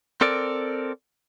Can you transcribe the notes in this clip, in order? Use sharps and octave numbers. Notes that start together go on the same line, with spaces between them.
C4 A4 A#4 D5